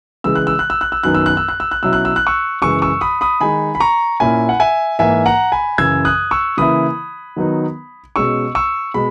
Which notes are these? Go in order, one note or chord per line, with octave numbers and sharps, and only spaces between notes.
C#3 E3 G#3 E6
F#6
E6
F#6
E6
F#6
E6
F#2 D#3 F#3 B3 D#4 F#6
E6
F#6
E6
F#6
E6
F#6
B2 F#3 C#4 E4 E6
F#6
E6
F#6
C#6 E6
F#2 C#3 E3 G#3 C#6 E6
C#6 E6
B5 D#6
B5 D#6
D#3 G#3 D#4 G#5 B5
B5
A#5 C#6
A#2 A#3 C#4 E4 G#5 B5
F#5
E5 G#5
G#2 E3 A#3 E5 G#5
F#5 A#5
G#5 B5
F#2 C#3 E3 E6 G#6
D#6 F#6
C#6 E6
C#3 E3 A#3 E4 B5 D#6
D#3 F#3 B3 D#4
B2 G#3 C#4 C#6 E6
C#6 E6
B2 G#3 B5